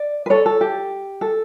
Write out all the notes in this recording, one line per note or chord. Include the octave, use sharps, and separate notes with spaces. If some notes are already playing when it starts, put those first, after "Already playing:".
Already playing: D5
B4
A4 C#5
A4
G4
A4